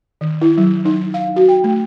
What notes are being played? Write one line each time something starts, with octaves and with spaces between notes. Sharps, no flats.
D#3
E4
F#3
D#4
F5
F#4
G5
A3